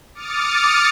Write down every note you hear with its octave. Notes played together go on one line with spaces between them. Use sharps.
D6 D#6 F6 A6 C#7